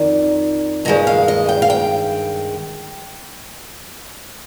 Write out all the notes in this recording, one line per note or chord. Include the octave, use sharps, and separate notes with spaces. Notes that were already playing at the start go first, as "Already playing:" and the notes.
Already playing: F2 D#3 D5
G2 D#3 G#3 D#5
F5
D#5
G5
F5
G5